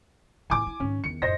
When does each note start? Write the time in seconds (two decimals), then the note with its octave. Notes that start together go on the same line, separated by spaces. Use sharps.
0.50 A2 E3 G#5 D6
0.67 E4
0.80 G#2 D#3 C#4
1.04 E2 D#3 C#7
1.22 F#2 A#2 C5 D#5 A#6